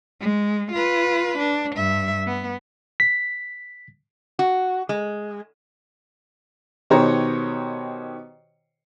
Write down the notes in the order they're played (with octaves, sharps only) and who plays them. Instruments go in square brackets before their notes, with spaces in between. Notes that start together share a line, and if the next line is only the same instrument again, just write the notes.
[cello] G#3
F4 B4
D4
G2 E5
B3
[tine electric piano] B6
[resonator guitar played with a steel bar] F#4
G#3
[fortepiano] B2 D#3 G4 C5 C#5 A#5